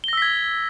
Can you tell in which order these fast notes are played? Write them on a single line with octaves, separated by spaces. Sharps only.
G7 A#6 E6 B6 G#6